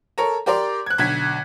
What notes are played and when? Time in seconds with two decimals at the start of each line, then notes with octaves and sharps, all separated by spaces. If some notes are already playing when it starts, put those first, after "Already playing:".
0.18 A4 A#4 C#5 A#5
0.46 G4 A#4 D5 A#5 C6 D6
0.86 F#6 G#6
0.98 B1 D3 G#6 B6